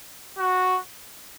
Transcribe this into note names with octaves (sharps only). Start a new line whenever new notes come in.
F#4